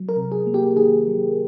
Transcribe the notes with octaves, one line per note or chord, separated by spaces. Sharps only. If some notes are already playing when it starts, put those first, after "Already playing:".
Already playing: F#3
A#4
C3
G#4
A#3
G4
D#3 G#4
F#3